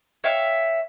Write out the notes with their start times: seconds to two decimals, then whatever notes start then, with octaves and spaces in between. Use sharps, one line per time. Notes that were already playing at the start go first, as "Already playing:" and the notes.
0.24 C#5 E5 F5 G5